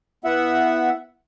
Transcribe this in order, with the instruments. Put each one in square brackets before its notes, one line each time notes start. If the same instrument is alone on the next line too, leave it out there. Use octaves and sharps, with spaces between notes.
[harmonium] B3 E5 F#5 [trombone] E4